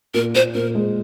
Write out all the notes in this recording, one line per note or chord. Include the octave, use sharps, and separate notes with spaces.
A#2 A#4
A#2 C5
A#2 A#4
G#3